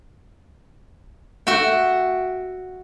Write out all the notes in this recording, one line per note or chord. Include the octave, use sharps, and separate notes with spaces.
F#4 E5 G5